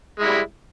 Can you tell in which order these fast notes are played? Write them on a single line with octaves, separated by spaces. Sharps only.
G#3 E4 G3